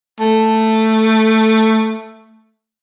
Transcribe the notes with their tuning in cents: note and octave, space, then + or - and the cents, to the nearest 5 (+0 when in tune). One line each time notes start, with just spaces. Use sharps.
A3 +5